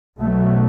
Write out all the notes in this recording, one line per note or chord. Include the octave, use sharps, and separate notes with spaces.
B1 B2 F#3 A3